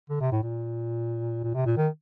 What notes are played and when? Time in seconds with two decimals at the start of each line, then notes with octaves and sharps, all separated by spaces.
0.10 D3
0.21 C3
0.32 A2
0.43 A#2
1.44 A#2
1.54 C3
1.66 A#2
1.77 D#3